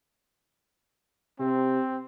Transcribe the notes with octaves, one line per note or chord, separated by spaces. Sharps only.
C3 C4